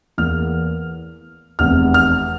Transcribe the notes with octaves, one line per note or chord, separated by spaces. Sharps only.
E2 E3 A#3 F6
F1 E2 C3 F6
F6